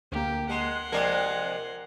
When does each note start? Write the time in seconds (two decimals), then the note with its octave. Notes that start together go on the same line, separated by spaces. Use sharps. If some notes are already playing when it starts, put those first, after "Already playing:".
0.12 D2 A#3 G4
0.49 G#3 F#5 C6
0.92 C3 F3 G#3 A#4 D5 G#6